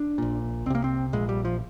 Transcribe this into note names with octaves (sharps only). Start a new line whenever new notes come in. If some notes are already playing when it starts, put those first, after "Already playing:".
Already playing: D4
A#1 A#2
C2 C3 A#3 C4
C4
A#1 A#2 G#3
G3
F3